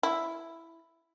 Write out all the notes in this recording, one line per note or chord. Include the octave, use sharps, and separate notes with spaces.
E4